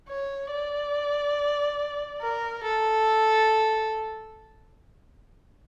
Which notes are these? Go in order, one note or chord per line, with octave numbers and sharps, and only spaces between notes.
C#5
D5
A#4
A4